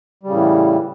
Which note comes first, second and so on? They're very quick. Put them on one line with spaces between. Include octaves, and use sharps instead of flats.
G3 C#3 A2 E3